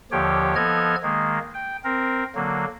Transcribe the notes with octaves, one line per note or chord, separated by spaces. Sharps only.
D#2 D3 F3 G4 C#5 G5
F3 B3 A4 D#5 F6 G#6
D#3 G#3 A#3
G5
C4 A#4
D3 F#3 A#3